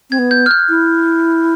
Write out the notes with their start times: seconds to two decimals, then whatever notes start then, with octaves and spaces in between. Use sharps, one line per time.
0.10 C4 G#6
0.19 B3
0.31 G6
0.46 F6
0.51 F#6
0.69 E4